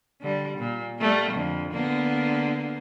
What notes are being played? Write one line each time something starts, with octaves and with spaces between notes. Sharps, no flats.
D3 G3
A#2
G3 A3 A#3
F2 D3
D3 A#3 B3